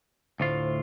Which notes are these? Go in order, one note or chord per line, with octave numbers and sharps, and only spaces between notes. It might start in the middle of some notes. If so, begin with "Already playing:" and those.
D2 A2 F4 C5